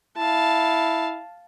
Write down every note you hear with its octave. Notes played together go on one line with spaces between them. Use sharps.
E4 F5 A5